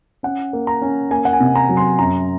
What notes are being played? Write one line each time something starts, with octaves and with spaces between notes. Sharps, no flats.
C#4 F#5
A#3
A#5
C#4
A#3 G#5
F#5
G#5
C3
A#5
F#3
C6
F#2 A#5